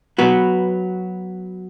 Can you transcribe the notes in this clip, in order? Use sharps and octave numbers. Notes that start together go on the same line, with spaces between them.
F#3 B3 F#4 B4